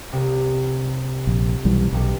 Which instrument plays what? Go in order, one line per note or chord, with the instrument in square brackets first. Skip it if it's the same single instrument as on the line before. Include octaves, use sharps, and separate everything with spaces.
[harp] C2 C3
[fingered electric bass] A#1
B1 E3 G3
[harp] E1 G3 C#7 [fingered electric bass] B1